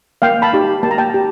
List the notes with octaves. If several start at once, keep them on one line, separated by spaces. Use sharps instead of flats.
A#3 F5 G5
A5 B5
D#4 G4
A#3 A5
A#5
G5 A5
G4